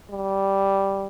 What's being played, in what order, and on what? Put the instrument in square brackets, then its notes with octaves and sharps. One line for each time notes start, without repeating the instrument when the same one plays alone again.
[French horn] G3